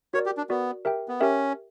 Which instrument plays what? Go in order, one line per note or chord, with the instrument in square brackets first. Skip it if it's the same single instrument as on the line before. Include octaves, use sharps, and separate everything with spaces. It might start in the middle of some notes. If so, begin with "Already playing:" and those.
[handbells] F#4 A#4 D5 [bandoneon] C#5
[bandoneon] G4
D4
[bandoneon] B3 [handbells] F#4 A#4 D5
[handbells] G4 A#4 E5 G5
[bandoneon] B3
[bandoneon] C#4 [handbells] G4 A#4 E5 G5